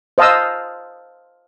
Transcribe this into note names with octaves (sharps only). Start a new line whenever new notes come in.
C5 D#5 F5 A5 D#6 E6